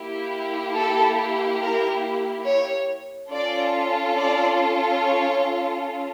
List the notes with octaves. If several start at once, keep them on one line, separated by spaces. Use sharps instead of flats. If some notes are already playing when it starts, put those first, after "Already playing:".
Already playing: A#3 E4 G4
A4
A#4
C#5
C#4 F4 A4 D5
D5
C#5